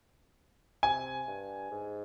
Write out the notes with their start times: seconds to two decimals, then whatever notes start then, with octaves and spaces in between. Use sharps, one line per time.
0.83 C3 G#5
1.28 G2
1.71 G#2